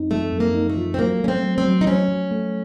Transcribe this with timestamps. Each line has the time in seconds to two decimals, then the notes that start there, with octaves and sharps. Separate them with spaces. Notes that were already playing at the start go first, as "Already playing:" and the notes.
Already playing: F#2 C4 D#4
0.11 F3 A3
0.32 F#2
0.40 A#3
0.54 D#4
0.69 A3
0.77 F3
0.94 C4
0.99 F#3 A#3
1.21 A3 C#4
1.28 C4
1.43 F#3
1.58 C4
1.64 F#3
1.81 D#4
1.87 F#3 C#4
2.08 F#3
2.31 A3